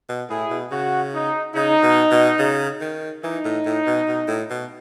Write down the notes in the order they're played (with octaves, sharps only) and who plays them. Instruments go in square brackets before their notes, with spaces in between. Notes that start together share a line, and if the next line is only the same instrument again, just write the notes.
[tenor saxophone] B2
[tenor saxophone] A2 [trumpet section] E4 G#4
[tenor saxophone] B2
[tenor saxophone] C#3 [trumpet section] F#4
[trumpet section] D#4
[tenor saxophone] C#3 [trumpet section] D#4
[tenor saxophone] B2
B2
C#3
D#3
[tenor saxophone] E3 [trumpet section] D#4
[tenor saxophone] A2
A2
B2
B2
A2
B2